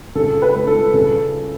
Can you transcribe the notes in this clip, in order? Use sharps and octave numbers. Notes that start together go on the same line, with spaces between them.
C#3 A4
B4
C#2
A4
C#3 A4